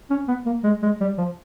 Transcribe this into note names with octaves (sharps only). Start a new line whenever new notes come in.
C#4
B3
A#3
G#3
G#3
G3
F3